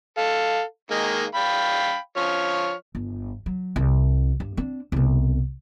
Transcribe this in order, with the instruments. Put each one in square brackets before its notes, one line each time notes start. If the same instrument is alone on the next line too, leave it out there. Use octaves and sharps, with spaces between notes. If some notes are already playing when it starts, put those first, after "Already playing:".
[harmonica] A4 F5
D#3 G#3 A#3
F5 G5 B5
F3 C#5 F6
[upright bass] G1
F#3
C2
G2
C4 D4
C2 B2